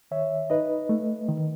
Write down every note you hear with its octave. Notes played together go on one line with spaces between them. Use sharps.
D#3 C#5 E5
D#4 B4 D#5
A3
D#3